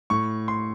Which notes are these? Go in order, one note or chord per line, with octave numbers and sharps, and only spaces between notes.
A2 C#6
C6